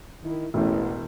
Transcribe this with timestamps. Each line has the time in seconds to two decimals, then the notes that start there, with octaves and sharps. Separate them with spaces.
0.23 D#3 E4
0.54 E1 A1 A2